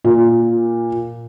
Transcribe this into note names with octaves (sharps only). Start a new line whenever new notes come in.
A#2